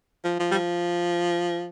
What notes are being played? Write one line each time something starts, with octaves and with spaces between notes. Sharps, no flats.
F3
F3
G3
F3